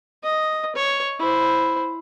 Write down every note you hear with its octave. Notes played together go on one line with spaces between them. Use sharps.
D#5
C#5
E4 C5